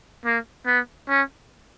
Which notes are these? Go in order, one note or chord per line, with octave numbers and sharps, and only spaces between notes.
A#3
B3
C#4